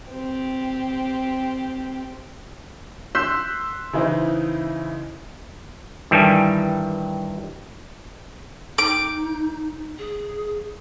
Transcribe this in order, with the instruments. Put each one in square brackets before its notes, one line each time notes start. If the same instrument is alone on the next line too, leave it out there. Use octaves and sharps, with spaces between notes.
[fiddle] C4 G4
[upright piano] C6 E6 F#6 G6 B6 E7
C#3 E3 D#4 E4 C5
[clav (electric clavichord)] G2 D#3 E3 G3 A4 G#5
[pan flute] D#4 [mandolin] D6
[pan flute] G#4